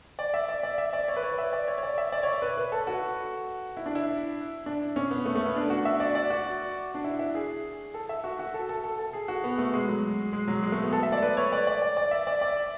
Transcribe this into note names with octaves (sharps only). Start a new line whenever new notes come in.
D5
E5
D5
D5
E5
D5
C#5
B4
C#5
E5
D5
C#5
C#5
D5
E5
D5
C#5
D5
B4
B4
A4
F#4
E4
D4
E4
D4
C#4
B3
A3
A3
B3
D4
F#4
E5
D5
D5
F#4
D4
E4
E4
G#4
A4
E5
F#4
F#4
A4
A4
A4
A4
G#4
F#4
B3
A3
G#3
F#3
G#3
F#3
G#3
A3
B3
A4
E5
D5
B4
C#5
D5
D5
D5
D5
E5
D5
D5